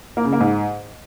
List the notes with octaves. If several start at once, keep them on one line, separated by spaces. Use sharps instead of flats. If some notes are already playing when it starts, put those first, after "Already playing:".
A#3
C#3
A#3
G#2